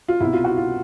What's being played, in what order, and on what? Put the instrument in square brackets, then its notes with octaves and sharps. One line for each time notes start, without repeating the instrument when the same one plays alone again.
[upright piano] F4
C2 B2 E4
F4
F#4
F4